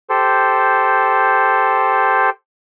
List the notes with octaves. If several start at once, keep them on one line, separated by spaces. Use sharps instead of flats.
G4 A4 C5